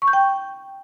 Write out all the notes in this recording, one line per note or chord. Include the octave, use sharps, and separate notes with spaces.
C#6
G6
G5